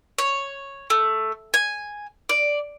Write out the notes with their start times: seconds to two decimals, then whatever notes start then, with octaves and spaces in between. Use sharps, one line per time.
0.18 C#5
0.90 A3
1.54 G#5
2.29 D5